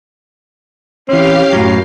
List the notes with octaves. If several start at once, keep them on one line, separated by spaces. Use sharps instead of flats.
E3 C4 C#4 G4 F5 C7
F#2 A2 F#3